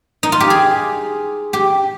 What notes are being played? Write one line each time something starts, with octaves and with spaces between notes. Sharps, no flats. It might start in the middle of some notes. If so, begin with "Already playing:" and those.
D#4
F4
G4
G#4
G4